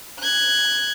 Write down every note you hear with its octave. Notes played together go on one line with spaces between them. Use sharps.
F#6 G#6